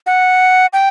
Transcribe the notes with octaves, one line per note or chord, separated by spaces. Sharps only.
F#5
G5